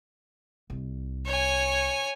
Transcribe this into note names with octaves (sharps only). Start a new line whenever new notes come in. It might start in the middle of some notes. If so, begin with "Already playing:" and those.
C2
C#5 G#5